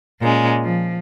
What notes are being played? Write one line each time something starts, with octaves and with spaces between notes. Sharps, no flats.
A#2 G#3 C#4
F3